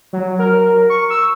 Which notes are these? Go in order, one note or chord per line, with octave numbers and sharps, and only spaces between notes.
F#3
A#4
C#6
E6